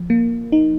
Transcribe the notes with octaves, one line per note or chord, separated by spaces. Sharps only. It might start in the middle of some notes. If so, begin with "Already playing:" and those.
Already playing: F3
A#3
D#4